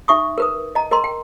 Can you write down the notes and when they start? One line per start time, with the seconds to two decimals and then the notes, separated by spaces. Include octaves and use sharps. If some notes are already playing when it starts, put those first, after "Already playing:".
0.08 D#4 E5 C#6 D#6
0.38 A#4 B4 D#6
0.75 D#5 A#5
0.91 A#4 D#5 A#5 C6
1.04 G5